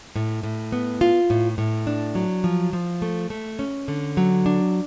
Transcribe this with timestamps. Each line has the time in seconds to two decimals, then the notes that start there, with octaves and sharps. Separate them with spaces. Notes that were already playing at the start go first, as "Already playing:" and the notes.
0.16 A2
0.43 A2
0.72 B3
1.01 F4
1.30 A2
1.58 A2
1.87 D4
2.15 F#3
2.44 F3
2.73 F3
3.02 A3
3.30 A3
3.59 C#4
3.88 D3
4.17 F#3
4.46 D4